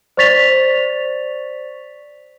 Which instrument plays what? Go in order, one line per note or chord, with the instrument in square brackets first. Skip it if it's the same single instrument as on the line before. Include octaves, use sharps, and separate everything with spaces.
[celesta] C5 D5 C#6 A6 B6 F7